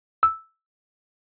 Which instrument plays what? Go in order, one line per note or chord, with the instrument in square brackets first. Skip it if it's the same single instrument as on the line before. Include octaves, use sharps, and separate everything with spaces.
[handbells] E6